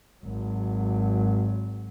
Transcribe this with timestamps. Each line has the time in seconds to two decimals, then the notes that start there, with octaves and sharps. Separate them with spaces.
0.24 G#1 F#3